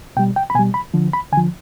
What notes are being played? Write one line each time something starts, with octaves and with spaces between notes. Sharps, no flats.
B2 G3 G5
G5
B5
B2 G3 G#5
B5
D3 F3
B5
D3 F3 G#5